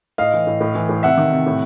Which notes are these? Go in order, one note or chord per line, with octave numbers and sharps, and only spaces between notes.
A2 D#5 F5
E3
A2
A2
E3
A2
C3 E5 F#5
D#3
C3
A2